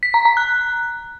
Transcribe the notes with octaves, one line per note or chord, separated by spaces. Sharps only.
B6
A#5
A#5
F#6